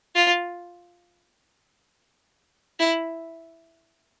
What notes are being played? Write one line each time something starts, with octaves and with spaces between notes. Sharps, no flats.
F4
E4